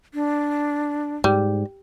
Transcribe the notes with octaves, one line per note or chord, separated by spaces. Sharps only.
D4
G#2 G3